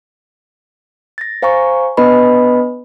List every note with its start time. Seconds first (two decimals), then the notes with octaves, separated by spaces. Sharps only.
1.18 A6 A#6
1.42 C5 F5 G#5 A#5 C#6
1.97 B3 D4 B4 D#5 G#5 B5